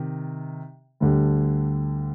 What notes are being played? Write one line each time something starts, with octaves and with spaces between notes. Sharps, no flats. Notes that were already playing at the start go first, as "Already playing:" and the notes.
Already playing: C3 D#3
D2 D3 G3